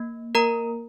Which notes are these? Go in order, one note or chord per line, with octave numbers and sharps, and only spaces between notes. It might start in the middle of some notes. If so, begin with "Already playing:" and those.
Already playing: A#3
A#3 A#4 A#5